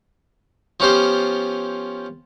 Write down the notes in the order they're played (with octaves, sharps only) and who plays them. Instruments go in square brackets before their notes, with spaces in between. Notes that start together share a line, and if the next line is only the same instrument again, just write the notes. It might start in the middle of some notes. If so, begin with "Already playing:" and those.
[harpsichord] F3 B3 C#4 F4 G4 C5